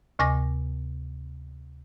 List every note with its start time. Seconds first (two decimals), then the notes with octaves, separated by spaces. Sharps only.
0.19 D2 C3 G#5 D6 A#6